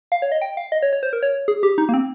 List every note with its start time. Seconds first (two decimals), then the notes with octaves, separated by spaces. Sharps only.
0.12 F5
0.22 C#5
0.32 D#5
0.42 G5
0.57 F5
0.72 D#5
0.83 C#5
0.93 C#5
1.03 C5
1.13 A#4
1.23 C#5
1.48 G#4
1.63 G4
1.78 D#4
1.89 A#3
1.94 C4